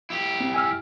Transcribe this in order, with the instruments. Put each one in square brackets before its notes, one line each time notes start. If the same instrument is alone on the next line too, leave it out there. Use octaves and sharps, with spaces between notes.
[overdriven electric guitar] E4 G4
[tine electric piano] C4
G#5 E6 F6